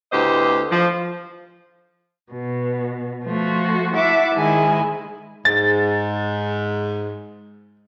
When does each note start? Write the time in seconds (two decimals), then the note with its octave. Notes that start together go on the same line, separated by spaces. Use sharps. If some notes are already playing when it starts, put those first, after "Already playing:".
0.13 D2 A2 B3 G4 C5 D#5
0.71 F3
2.32 B2
3.26 F3 A3 F#4
3.96 E4 E5 F#5 A5 D6
4.35 G#2 D#3 G#3 E4 G#5
5.45 G#2 A6